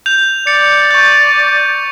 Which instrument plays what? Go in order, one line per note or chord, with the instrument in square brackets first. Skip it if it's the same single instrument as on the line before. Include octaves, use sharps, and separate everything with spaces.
[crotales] G6 F7
[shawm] D5 [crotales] C#7
[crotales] C#6 G6